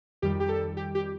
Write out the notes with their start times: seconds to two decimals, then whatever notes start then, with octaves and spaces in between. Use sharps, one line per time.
0.22 F2 D#3 G3 G4
0.40 G4
0.49 A4
0.77 G4
0.95 G4